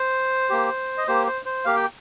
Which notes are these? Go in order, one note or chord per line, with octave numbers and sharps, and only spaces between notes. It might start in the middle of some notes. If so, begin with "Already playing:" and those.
Already playing: C5
A#3 G4
D#5
A#3 G4 C5
C5
C5
A#3 G4 F5
G5